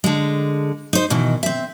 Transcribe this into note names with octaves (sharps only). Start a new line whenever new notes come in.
D3 G#3
D#4 C5
B2 D#3 E3
C4 E5